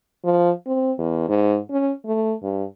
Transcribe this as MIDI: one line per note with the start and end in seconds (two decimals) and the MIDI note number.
0.24 0.50 53
0.66 0.92 60
0.98 1.27 40
1.28 1.58 44
1.70 1.93 61
2.05 2.34 57
2.43 2.64 43